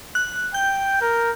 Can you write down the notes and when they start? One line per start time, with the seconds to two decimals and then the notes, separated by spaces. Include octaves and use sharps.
0.15 F#6
0.54 G5 G6
1.01 A#4